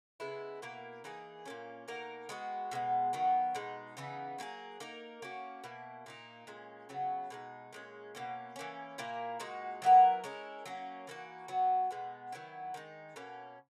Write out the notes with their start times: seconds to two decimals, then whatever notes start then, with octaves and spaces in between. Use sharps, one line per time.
0.20 C#3 G#3 B3 E4
0.62 B2 A#3 E4 A#4
1.04 E3 A#3 D#4 G#4
1.46 A#2 A#3 C#4
1.88 B2 A#3 D#4 A#4
2.29 G#3 B3 F#4
2.71 B2 G#3 B3
3.13 D#3 F#3 B3
3.55 B2 G#3 D#4
3.97 C#3 E3 B3 D#4
4.38 F#3 A#3 D#4 G#4
4.80 A#3 D#4 A#4
5.22 A#3 C#4 F#4
5.64 B2 A#3 E4
6.06 A#2 A#3 D#4
6.47 A#2 G#3 C#4
6.89 C#3 F#3 B3
7.30 B2 G#3 D#4
7.73 A#2 G#3 C#4
8.15 B2 A#3 C#4
8.56 E3 A#3 C#4
8.98 A#2 A#3 E4 A#4
9.40 A#2 G#3 D#4 F#4
9.82 F#3 B3 E4 A#4
10.24 G#3 C#4 E4 A#4
10.66 F#3 A#3 C#4
11.07 E3 A#3 D#4 F#4
11.48 F#3 B3 F#4
11.91 B2 G#3 B3
12.32 D#3 F#3 B3 E4
12.74 D#3 G#3 D#4
13.16 B2 A#3 C#4